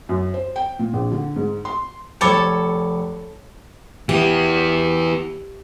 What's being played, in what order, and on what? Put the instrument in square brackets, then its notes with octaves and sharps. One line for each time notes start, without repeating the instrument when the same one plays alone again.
[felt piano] F#2
C5
G5
A#2
A#1
D3
G#2
C6
[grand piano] F1 C#7 [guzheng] A4 C#5 A5 [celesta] G5 B5 D6
[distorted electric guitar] E3 B3 [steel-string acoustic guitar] G4